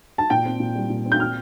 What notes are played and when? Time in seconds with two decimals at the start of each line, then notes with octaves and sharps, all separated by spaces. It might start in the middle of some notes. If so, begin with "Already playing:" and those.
0.18 A5
0.30 A#2 G5
0.45 C4
0.60 A#2
0.75 G3
0.90 A#2
1.05 C4
1.12 G6
1.20 F6